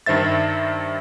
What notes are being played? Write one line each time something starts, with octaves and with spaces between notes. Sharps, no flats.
G2 D#3 C5 E5 A6